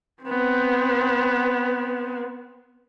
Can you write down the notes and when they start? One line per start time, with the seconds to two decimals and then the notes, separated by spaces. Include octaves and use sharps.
0.23 B3 C4